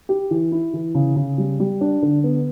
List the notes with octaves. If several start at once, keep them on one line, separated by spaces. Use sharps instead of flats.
G4
E3
E4
E3
C#3
C#3
G3
G3
D4
D3
B3